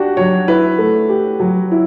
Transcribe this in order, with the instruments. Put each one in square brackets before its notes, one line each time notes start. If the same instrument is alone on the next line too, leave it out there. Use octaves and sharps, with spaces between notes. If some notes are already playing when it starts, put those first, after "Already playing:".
Already playing: [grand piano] D4 F#4 [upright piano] G4
[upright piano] F#3 [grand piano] C#5
[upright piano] E4 [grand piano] B4
[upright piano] A3
G4
F#3
E4